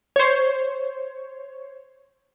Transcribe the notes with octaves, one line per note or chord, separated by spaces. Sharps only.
C5 C#5